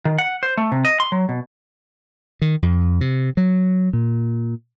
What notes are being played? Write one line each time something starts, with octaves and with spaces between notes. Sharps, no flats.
D#3
F#5
C5
A3
C3
D#5
C6
F#3
B2
D#3
F2
C3
F#3
A#2